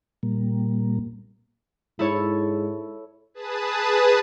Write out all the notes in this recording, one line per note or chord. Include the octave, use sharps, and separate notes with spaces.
A#2 G3 A#3
G#2 E4 A4 C#5
G#4 B4 A5 D#6